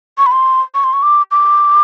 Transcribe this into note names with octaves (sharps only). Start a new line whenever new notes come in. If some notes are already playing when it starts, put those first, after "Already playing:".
C#6
B5
C6
C#6
C6
C#6
D6
D6